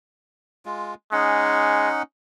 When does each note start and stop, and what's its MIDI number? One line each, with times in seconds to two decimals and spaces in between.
0.65 0.94 56
0.65 0.94 65
1.13 1.90 56
1.13 2.02 61
1.13 2.02 63
1.13 2.02 78